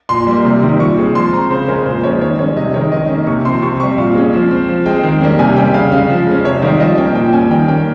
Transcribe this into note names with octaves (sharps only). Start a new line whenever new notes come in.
A#2 C6
G3 A#3
C3
D#3 G3
A#2 C#6
G#3 C4
F3 C6
C4 A#5
C#3 C5
G#3 C#4 A#4
A#2 C5
F3 G#3 C#4 C#5
D#3 C#5
G3 C#4 C#5
C3 D#5
D#3 G#3 C#5
D#3 D#5
C#4
A#3
C3 C#6
F3 C4 C6
C3 C#6
G3 C4 C#6
A#2 F5
G#3 C#4
F3
C4
F3
G#3 C4 G5
D#3
G3 A#3 C#4
C3 G#5
G3 C#4 G5
C#3 F5
G#3 C#4 F5
F3
G#3 C#4
C3 C#5
D#3 G3 C4 F5
F3 D#5
A#3 C#4 G5
A#2 G5
G3 C#4 G#5
D#3 G5
A#3 C#4 G5